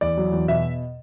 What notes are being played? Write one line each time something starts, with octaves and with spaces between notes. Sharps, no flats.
E2 D5
F#3
E2
B2 E5